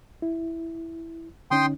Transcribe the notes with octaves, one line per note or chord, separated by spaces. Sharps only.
E4
D3 C#4 D#4 G5 C6 D#6